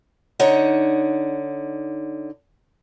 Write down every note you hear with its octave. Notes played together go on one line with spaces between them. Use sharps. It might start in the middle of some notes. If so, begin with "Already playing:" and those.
D3 D#4 C#5 F#5